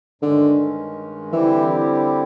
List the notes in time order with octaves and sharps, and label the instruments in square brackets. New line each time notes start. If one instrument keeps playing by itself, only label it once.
[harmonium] G2 D#3 G#3 C#4 [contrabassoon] D3
[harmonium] D3 G3 C4 E4 G4 [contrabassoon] E3